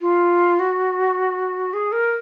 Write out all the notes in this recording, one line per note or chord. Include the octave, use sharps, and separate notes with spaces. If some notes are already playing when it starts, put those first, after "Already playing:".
F4
F#4
G#4
A#4